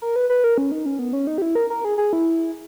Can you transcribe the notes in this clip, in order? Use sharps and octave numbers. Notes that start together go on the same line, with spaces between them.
A#4
B4
B4
A#4
C#4
D#4
C#4
B3
C#4
D#4
G4
E4
A#4
A#4
G#4
G#4
E4